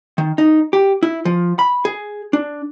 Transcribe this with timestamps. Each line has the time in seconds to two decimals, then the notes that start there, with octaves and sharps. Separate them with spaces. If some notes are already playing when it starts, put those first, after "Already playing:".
0.18 D#3
0.38 D#4
0.73 G4
1.03 E4
1.25 F3
1.59 B5
1.85 G#4
2.33 D4